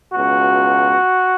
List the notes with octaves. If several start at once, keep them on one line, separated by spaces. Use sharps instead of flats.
C#2 B2 F#4